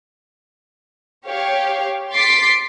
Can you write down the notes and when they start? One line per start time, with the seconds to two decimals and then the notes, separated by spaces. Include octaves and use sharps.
1.27 G4 C#5 F5
2.14 C6 D6 A6 B6 C7 D7